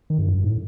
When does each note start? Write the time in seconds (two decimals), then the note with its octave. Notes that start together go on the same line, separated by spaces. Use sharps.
0.10 D#3
0.18 G2
0.27 F#2
0.34 G2
0.43 A2